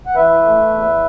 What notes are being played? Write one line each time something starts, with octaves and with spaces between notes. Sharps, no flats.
F#5
E3 B4 E5
A3
E2